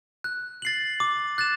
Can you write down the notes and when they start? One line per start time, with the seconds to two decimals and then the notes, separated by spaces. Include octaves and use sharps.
0.24 F#6
0.62 A6 C7 F#7
1.00 D6
1.38 F#6 A6 E7